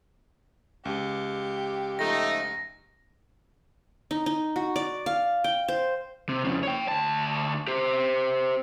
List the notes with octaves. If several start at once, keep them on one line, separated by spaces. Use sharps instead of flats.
C#2 G4
F3 A3 D#4 A#6
D#4
D#4
F#4
D5
F5
G5
C5
C3
F2 C#3
C#5 G5
D2 A5
G4 C5